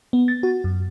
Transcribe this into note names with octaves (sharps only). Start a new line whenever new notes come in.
B3
A6
F#4
F#2